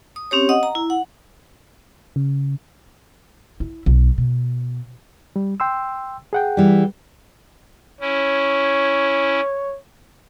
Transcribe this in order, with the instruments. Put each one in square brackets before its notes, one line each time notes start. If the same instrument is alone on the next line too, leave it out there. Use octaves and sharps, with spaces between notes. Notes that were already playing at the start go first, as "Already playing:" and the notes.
[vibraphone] D#6
C4 C#4 G4 C#5
D#5 F#5 D#6
A#5
E4
F#5
[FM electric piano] C#3
[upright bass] E4
B1
B2
[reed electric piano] G3
G5 C6 E6
G#4 F#5 G5
[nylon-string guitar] E3 G3
[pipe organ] C#4 E4 [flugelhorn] C#5